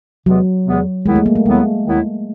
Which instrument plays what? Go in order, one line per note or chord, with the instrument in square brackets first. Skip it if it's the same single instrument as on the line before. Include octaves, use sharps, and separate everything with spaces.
[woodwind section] E2 C3 E3 G#3 B3 [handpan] F#3
[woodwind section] E2 C3 E3 G#3 B3
[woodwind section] D#2 D#3 F#3 B3 E4 [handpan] G#3
[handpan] A3
A#3
A3
[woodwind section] D#2 D#3 F#3 B3 E4 [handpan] G#3
[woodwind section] D#2 D#3 F#3 B3 E4